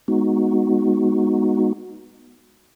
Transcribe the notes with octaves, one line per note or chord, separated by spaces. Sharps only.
G#3 B3 D#4 F#4